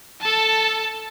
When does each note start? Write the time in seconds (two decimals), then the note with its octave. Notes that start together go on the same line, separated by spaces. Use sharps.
0.21 A4 A5